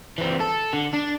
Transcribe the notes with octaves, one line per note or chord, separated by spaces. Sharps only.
E3 C4
A4
D3
D4